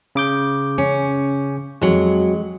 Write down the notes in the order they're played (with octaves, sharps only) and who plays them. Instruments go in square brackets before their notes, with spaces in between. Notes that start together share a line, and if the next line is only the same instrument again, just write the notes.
[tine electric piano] C#3 D6 G6
[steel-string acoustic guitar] C#4
[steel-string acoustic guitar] F2 F#3 [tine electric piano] G#3